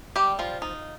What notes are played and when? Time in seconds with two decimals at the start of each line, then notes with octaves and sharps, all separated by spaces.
0.16 G3 G4
0.39 F3 F4
0.62 D#4